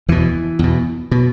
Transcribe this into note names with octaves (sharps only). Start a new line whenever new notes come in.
E2 B2 E3
E2 B2
B2